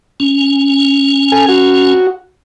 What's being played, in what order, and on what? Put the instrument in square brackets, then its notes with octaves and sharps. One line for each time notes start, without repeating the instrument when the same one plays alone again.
[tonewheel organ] C#4
[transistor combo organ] A4 G#5
F#4